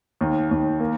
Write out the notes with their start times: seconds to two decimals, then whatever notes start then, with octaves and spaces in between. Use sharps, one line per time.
0.21 D#2
0.51 D#2
0.80 A#3